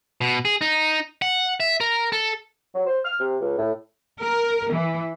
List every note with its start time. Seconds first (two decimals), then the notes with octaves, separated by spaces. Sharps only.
0.21 B2
0.45 G#4
0.61 D#4
1.22 F#5
1.60 E5
1.81 A#4
2.12 A4
2.75 F#3
2.87 C5
3.05 F6
3.20 C3
3.42 C#2
3.58 A2
4.20 A#4
4.72 E3